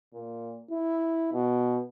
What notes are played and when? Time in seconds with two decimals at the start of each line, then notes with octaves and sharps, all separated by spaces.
0.14 A#2
0.71 E4
1.33 B2